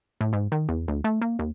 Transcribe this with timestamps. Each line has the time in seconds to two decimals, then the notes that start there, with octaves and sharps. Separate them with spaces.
0.21 A2
0.33 G#2
0.52 D#3
0.69 E2
0.88 D2
1.04 A3
1.21 A#3
1.39 D#2